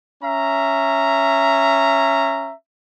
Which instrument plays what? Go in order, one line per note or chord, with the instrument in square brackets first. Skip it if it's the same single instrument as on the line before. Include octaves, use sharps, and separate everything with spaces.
[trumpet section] C#4 E5 A#5